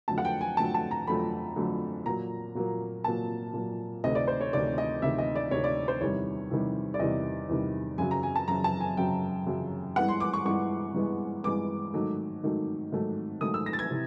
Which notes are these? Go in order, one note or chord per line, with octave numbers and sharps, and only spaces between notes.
F2 D3 F#3 A3 A5
F#5
G5
G#5
F2 D3 F#3 A3 A5
A5
A#5
F2 D3 F#3 A3 B5
F2 D3 F#3 A3
A#2 F#3 A#3 A#5
A#2 F#3 A#3
A#2 F#3 A#3 A5
A#2 F#3 A#3
D2 C3 D#3 D#5
D5
C5
C#5
D2 C3 D#3 D5
D#5
D2 C3 D#3 E5
D#5
D5
D2 C3 D#3 C#5
D5
C5
E2 C3 D#3 G3 C#5
E2 C3 D#3 G3
D5
E2 C3 D#3 G3 D#5
E2 C3 D#3 G3
F#2 C#3 F#3 G#5
A#5
G#5
A5
F#2 C#3 F#3 A#5
A5
G#5
F#2 C#3 F#3 G5
F#2 C#3 F#3
G2 E3 G#3 B3 F#5
C6
D6
C#6
G2 E3 G#3 B3 C#6
G2 E3 G#3 B3
G2 E3 G#3 B3 D6
G#2 D#3 F#3 A3
G#2 D#3 F#3 A3
G#2 D#3 F#3 A3
G#2 D#3 F#3 A3 D#6
E6
A#6
A6
G#6
C3 E3